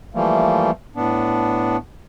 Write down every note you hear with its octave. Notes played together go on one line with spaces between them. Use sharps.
E3 F3 G3 A3 A#3
A2 B3 D4